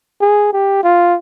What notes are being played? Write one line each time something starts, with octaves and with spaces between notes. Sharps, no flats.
G#4
G4
F4